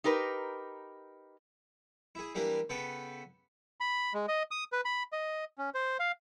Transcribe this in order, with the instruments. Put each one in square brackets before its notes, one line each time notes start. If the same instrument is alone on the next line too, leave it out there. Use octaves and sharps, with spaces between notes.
[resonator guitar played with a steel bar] D#4 G4 A#4 B4
[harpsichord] E4 G#4
E3 G3 A#3 D4 G4 A#4
C#3 B3 A4 B4 G5 B5
[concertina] B5
G#3
D#5
D#6
B4
B5
D#5
C#4
C5
F5